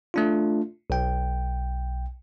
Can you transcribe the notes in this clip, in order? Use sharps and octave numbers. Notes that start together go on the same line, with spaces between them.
A3 D4 F4
B1 G5